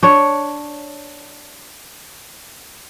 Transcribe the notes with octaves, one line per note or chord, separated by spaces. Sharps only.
D4 C#5